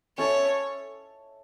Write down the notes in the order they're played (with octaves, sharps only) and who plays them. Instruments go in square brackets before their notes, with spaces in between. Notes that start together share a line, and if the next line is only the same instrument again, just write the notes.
[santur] C#4 A4 E5 [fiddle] C#5